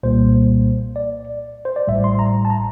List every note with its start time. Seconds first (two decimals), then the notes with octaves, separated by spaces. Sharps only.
0.03 C2 A#2 G3 A#3 C5
0.96 D5
1.65 C5
1.76 D5
1.88 A1 A2 G3 E5
2.04 C6
2.19 A#5
2.45 A5
2.50 A#5